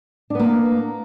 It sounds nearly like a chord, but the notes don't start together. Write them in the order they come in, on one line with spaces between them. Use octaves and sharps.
D4 B3 A#3